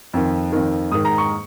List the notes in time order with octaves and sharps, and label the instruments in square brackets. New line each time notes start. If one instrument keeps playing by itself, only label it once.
[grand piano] F2 D#3
F2 D#3
G#2 D#3 D#6
A#5
C#6